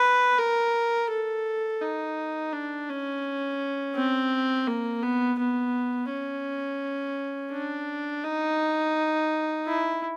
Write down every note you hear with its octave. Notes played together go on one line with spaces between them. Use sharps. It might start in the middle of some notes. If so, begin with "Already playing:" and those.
Already playing: B4
A#4
A4
D#4
D4
C#4
C4
A#3
B3
B3
C#4
D4
D#4
E4